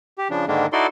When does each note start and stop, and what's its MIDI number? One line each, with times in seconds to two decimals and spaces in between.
0.18 0.28 67
0.30 0.45 49
0.30 0.45 53
0.30 0.45 62
0.48 0.66 44
0.48 0.66 50
0.48 0.66 51
0.48 0.66 56
0.48 0.66 58
0.48 0.66 62
0.73 0.87 63
0.73 0.87 64
0.73 0.87 66
0.73 0.87 69
0.73 0.87 74
0.73 0.87 84